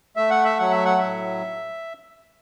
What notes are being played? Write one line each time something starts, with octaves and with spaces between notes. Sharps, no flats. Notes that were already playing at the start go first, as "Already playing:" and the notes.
A3 E5
F#5
E5
F#3 F#5
E5
F#5
A2 E5